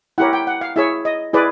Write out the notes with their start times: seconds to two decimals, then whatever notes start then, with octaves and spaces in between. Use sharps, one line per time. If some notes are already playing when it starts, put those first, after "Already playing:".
0.18 E4 G4 A#4 C#5 F#5
0.33 G5
0.47 F#5
0.61 F5
0.76 E4 G#4 C#5 E5
1.05 D#5
1.33 E4 G#4 B4 D5